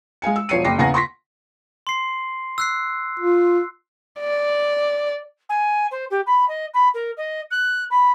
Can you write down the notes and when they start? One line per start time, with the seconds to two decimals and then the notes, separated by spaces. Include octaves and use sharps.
0.22 G#3 F5 G#5 C#7
0.36 E6
0.49 E1 F3 C#5 C7 C#7 D#7
0.64 F#1 G5 D6 A#6 C7
0.78 E2 C#3 F#5 G#5 A#5 A#6
0.94 C6 C#6 A#6 B6
1.87 C6 C7
2.58 E6 F#6 C7
3.19 F4
4.20 D5
5.49 G#5
5.91 C5
6.10 G4
6.26 B5
6.48 D#5
6.74 B5
6.94 A#4
7.17 D#5
7.51 F#6
7.90 B5